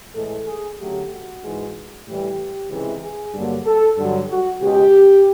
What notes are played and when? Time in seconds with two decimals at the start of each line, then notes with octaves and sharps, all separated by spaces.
0.15 A2 E3 G#3 A4
0.46 G#4
0.79 D2 C#3 F#3 A3 G4
1.11 F#4
1.43 G#2 E3 G#3
2.06 A2 E3 G3 G4
2.70 C#2 C3 E3 G#3
3.02 G#4
3.34 G2 D3 F#3 A#3
3.66 A4
3.97 G2 D3 F#3
4.30 F#4
4.61 C#2 B2 G#3 G4